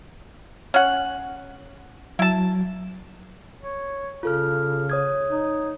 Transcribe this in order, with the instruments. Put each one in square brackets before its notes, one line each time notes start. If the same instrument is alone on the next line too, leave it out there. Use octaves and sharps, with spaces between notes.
[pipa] C#4 F#5
[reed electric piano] F#3 [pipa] E4 A5
[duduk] C#5
[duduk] C#3 [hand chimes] F4 A4 F6
[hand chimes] C#5 D#6 G#6
[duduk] D#4